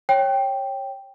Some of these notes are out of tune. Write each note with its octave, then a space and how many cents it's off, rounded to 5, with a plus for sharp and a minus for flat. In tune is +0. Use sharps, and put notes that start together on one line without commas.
C#5 -15 G5 +0